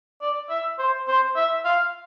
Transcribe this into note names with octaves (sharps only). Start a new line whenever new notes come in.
D5
E5
C5
C5
E5
F5